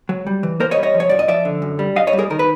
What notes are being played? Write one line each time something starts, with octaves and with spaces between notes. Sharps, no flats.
F#3
G3
E3
A#3 A#4 C5
C#5 D#5
G3
C#5 D#5
F3
C#5
F#2 D5
D#5
F3 D5 E5
D3
F#2
G3
F#2 D#5 F5
C#5 D#5
G3
G#4 A#4
D#3 A#4
B4